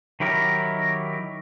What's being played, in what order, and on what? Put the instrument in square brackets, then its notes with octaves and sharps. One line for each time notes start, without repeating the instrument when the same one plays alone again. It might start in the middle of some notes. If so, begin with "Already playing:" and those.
[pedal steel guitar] D#3 F#3 E4 G4 A#4